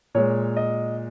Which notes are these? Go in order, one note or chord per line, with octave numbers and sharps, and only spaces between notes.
A#2 G#3 C#5
D#5